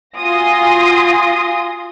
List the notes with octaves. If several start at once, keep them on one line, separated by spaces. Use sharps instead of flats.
F4 F#4 G#5 C6 D#6 A#6